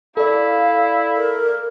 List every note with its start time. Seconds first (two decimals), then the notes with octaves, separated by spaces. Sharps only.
0.17 E4 A4 D5 F5
1.17 A#4